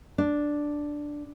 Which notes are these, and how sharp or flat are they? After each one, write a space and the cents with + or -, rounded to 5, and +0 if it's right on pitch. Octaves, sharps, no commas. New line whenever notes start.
D4 +0